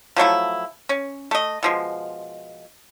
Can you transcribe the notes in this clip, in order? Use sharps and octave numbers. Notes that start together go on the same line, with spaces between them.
F3 F#3 A3 E4
C#4
A3 D#5
B2 F3 G#3